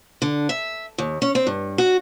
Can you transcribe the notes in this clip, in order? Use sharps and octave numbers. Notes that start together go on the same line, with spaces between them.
D3
E5
D#2
C#4
C4
G2
F#4